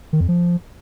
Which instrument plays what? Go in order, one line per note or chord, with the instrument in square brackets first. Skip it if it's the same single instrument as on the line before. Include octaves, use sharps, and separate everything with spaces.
[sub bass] D#3
F2
F3